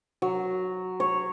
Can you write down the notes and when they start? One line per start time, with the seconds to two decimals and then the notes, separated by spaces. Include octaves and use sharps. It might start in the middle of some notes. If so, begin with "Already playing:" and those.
0.22 F#3
1.00 C#5